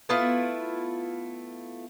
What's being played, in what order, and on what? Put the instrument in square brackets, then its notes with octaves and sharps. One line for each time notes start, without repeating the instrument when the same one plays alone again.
[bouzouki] A3 B3 E4 F4